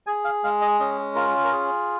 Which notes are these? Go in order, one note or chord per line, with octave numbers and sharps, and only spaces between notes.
G#4 G#5
F5
G#3 F5
D#5
C#4 D#5
F4 A#4
A#4
G#4